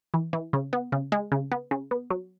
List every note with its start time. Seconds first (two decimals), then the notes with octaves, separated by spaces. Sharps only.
0.14 E3
0.33 E3
0.53 C#3
0.73 B3
0.92 C#3
1.12 G#3
1.32 C#3
1.52 B3
1.71 C#3
1.91 B3
2.10 F#3